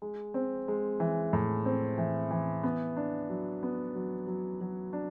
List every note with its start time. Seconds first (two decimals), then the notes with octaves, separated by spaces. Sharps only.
0.02 G#3
0.34 C4
0.68 G#3
1.00 E3
1.33 A2
1.65 C4
1.98 E3
2.31 E3
2.63 B3
2.97 D4
3.30 F#3
3.63 B3
3.95 F#3
4.27 F#3
4.61 F#3
4.93 D4